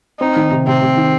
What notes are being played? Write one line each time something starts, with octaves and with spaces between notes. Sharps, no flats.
C4 D#4
D#3
C3
C3 C4
C3
D#3